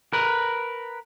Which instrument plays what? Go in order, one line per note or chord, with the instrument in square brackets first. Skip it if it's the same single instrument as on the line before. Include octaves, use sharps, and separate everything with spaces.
[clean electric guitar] A#4 B4